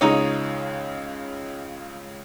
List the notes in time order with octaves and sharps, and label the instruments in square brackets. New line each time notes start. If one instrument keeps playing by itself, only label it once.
[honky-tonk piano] C#2 C#3 G#3 [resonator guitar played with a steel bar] D#4 C#5